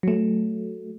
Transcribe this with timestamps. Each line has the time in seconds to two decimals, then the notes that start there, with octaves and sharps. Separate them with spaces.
0.03 F#3 A3